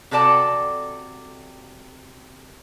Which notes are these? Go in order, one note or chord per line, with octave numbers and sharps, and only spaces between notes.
C3 F#4 A4 D5 A5